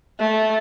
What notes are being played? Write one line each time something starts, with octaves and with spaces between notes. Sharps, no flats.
A3